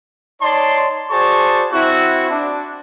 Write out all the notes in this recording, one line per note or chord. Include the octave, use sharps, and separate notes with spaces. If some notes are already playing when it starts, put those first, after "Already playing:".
D#4 C#5 D5 A5 C6
F#4 G#4 C5 D5 A5 C#6
C4 E4 F#4
D4